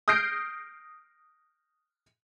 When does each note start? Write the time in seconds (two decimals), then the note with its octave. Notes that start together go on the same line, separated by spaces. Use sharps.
0.08 D#6 F6 G6 A#6 C7 D7